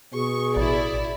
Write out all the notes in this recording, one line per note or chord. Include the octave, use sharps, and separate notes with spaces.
B2 G#4 C#6
A1 E4 D5